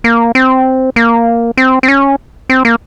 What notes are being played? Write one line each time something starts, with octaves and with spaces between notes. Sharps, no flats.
A#3
C4
A#3
C4
C4
C#4
C4
A#3